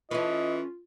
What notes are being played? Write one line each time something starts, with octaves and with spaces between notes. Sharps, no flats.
E3 C#4 F4 A4 B4 D#5